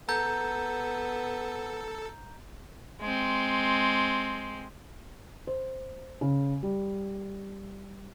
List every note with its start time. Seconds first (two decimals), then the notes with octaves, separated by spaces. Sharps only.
0.09 B3 A4 A#5 G6
3.01 G#3 C4
5.47 C5
6.21 C#3
6.63 G3